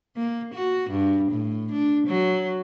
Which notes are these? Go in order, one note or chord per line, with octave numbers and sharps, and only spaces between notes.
A#3
F#4
G2
A2
D4
F#3